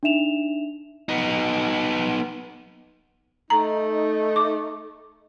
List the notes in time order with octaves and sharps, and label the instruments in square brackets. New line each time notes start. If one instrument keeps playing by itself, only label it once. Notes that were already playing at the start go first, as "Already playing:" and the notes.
[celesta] D4 D#4 E5 E7 F7
[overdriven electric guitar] B3 D#4
[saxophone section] A3 D#4 [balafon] A#5
[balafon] D6